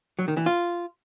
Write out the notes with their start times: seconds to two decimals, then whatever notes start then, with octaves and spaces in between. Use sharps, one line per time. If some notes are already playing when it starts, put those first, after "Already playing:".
0.19 F#3
0.28 D#3
0.37 E3
0.46 F4